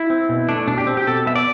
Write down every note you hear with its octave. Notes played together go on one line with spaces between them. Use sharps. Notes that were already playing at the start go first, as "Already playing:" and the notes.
Already playing: E4
C4
B2
A3 D4
B2 D4
G4
C4
G4
B2 A4
B3 E5
D5